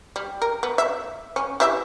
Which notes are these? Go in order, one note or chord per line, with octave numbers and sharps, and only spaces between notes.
G3
A#4
B3
E5
C#4
E3 G4 E5